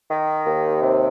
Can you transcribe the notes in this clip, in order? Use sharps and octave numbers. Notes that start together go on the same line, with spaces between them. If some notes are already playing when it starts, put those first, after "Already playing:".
D#3
D#2
C3